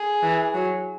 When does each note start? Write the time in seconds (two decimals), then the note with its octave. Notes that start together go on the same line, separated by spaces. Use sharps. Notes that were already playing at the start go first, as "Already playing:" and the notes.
Already playing: G#4
0.23 E3
0.54 F#3